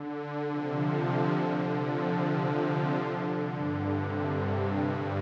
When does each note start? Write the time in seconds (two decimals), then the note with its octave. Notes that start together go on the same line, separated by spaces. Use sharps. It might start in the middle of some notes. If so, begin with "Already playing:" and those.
Already playing: D3
0.48 C3 F3
1.32 D3
1.73 C3 F3
2.15 C3 F3
2.99 D3
3.41 G2
3.83 C3
4.66 G2